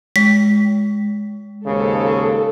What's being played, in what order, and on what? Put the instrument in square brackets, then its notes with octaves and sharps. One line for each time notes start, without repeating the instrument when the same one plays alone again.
[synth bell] G#3 [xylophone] B6
[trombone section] D#2 G#2 C#3 [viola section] A4